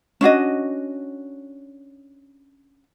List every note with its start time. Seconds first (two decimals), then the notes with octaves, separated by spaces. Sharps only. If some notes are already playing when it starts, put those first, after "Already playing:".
0.21 C#4 D4 F#4 D#5